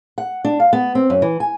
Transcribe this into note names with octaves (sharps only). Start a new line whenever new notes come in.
F#5
D4
F5
B3
C4
F#2
E3
G#5